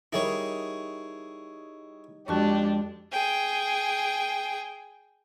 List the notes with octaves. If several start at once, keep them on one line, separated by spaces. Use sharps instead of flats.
G3 D#4 E4 G#4 A#4 C#5
F2 G#3 D4 F#4 G4 A5 C#6 E7
G#4 G5